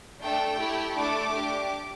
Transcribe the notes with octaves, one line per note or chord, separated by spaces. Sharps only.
A3 D4 A4 G5
A3 E4 G4
A3 D4 A4 D6
D4 G4